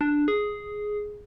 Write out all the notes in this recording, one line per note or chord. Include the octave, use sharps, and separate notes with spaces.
D4
G#4